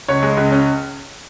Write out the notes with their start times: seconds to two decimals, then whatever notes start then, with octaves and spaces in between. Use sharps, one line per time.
0.08 C#2 C#5
0.23 G#3
0.37 C#2
0.51 C#4